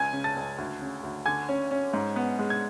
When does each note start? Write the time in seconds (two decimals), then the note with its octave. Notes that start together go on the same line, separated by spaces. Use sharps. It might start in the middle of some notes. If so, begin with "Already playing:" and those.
Already playing: C#2 G#5 G#6
0.13 C#3
0.24 A5 A6
0.36 C#2
0.58 D2
0.81 C#3
1.03 D2
1.26 D3 G#5 G#6
1.49 C#4
1.71 C#4
1.93 G#2
2.16 B3
2.39 G#3
2.50 G#6